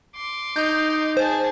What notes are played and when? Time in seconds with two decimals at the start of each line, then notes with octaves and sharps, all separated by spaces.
0.16 C6 D6
0.56 D#4 G6
1.17 G#4 C5 A5